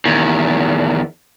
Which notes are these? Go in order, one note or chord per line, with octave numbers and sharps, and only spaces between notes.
E2 D#3